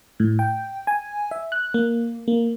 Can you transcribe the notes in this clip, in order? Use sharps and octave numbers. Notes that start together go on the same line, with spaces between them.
A2
G5
G#5
E5
F#6
A#3
A#3